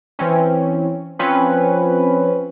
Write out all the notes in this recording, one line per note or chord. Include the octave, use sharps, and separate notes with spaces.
E3 C4 C#4
F3 C4 C#4 B4